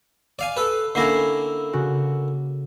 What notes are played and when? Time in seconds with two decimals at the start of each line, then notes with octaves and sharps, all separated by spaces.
0.39 D5 F5 G#5
0.57 A4 B4
0.95 D3 A#3 C#4 E4 A#6 C7
1.73 C#3 F#4